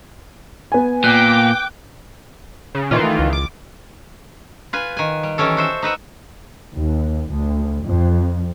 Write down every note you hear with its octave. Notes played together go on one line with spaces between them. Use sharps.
B3 G#5
A#2 G5 D6 F#6
C#3
A#2 D#3 E3 F4
A3
C#2
D6
F4 B4 G#5
D#3 G#5
G3
D#3 E3 G3 C#4 A4
F#4 C5 E5
D#4 B4 E5 F#5
D#2
D2
F2